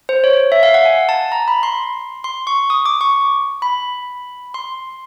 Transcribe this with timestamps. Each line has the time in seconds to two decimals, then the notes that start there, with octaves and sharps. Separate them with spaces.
0.09 C5
0.24 C#5
0.52 E5
0.63 F5
0.74 F#5
0.85 G#5
1.09 A5
1.32 A#5
1.48 B5
1.63 C6
2.24 C6
2.47 C#6
2.70 D#6
2.86 D6
3.01 C#6
3.62 B5
4.54 C6